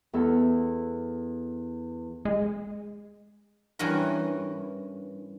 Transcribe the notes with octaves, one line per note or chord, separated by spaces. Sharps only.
E2 A4
G#3
G2 E3 C#4 F#4 A#4